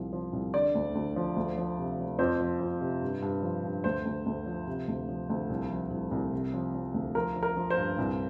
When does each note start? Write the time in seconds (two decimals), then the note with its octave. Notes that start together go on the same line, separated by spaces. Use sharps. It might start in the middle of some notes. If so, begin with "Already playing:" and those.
Already playing: C2 F3
0.13 F3
0.33 C2
0.54 D3 D5
0.75 D2
0.95 D2
1.16 F3
1.36 D2
1.58 F3
1.79 C3
1.99 F3
2.19 F2 C5
2.40 F3
2.60 F2
2.81 C3
3.02 G2
3.22 G2
3.43 F3
3.64 G2
3.84 D2 C5
4.05 D2
4.26 D2
4.46 F3
4.67 C3
4.88 D2
5.09 F3
5.30 D2
5.50 C2
5.71 F3
5.91 C2
6.11 C2
6.32 C3
6.54 F3
6.75 F3
6.94 D2
7.15 F3 A#4
7.36 F3
7.43 A#4
7.57 F3
7.70 C5
7.78 G2
7.98 C2